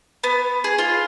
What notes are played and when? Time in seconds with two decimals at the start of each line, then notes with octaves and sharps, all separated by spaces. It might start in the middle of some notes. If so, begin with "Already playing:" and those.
0.24 B3
0.64 G#4
0.78 F4